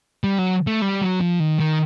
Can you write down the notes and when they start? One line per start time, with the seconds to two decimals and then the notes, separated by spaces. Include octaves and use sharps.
0.24 G3
0.38 F#3
0.67 A3
0.82 G3
1.01 F#3
1.21 F3
1.40 D#3
1.59 D#3